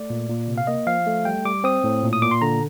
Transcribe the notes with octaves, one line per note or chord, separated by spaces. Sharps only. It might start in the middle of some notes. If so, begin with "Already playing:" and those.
Already playing: A3 D5
A#2
A#2
C3
F5
A#3 D#5
F3 F5
A3
G3 G5
G3 D6
C4 D#6
A2
A#2
D#6
A#2 D6
C6
D3 A#5